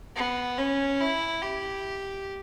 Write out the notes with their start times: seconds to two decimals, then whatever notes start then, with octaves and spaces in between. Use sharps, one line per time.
0.16 B3
0.58 C#4
1.01 E4
1.43 G4